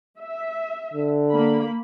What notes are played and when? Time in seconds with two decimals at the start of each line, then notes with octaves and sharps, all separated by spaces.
0.19 E5
0.93 D3
1.30 A#3 B5